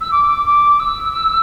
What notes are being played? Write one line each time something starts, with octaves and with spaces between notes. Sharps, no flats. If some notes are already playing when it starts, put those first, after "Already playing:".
E6
D6
D6
E6